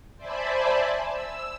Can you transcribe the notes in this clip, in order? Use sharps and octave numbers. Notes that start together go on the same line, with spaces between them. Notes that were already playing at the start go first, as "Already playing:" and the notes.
C5 D5 E5 G#5 A5 B5
E6